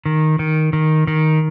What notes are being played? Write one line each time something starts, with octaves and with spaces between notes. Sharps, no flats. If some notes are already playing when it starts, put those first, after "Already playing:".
D#3
D#3
D#3
D#3